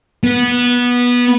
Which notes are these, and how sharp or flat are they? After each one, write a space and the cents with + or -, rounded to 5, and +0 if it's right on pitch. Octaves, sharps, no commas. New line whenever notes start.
B3 -15